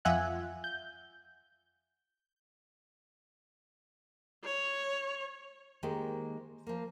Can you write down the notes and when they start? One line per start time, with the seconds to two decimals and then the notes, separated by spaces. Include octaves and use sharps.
0.05 F2 F4 E5 F#5 G#5 F#6
0.64 G6
4.44 C#5
5.83 D#3 G#3 A#3 G4 C5
6.67 F3 A#3